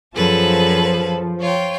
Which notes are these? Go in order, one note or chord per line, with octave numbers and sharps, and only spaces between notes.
F#2 F3 G#4 A4 B4 A5
F4 C#5 G5